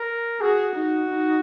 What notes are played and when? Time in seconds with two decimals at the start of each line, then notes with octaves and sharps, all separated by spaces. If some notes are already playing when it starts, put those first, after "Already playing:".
Already playing: A#4
0.41 F#4 G#4
0.75 D#4
1.10 D#4